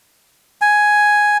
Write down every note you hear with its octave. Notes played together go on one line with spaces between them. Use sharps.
G#5